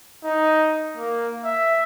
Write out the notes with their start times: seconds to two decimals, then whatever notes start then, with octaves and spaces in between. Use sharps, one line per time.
0.24 D#4
0.97 A#3
1.45 E5